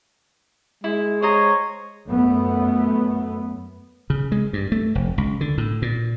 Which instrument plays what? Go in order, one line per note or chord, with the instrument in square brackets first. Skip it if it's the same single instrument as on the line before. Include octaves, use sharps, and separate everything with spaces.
[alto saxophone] G#3 [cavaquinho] E4
[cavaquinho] C5 D#5 A#5 [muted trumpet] C#5
[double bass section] F#2 A3 B3
[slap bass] C#3
G#3
G2
A3
F1
C#2
D3
A2
A#2